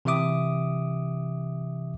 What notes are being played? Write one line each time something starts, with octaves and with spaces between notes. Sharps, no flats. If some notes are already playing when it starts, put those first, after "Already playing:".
C3 E3 G4 E5 D6 D#6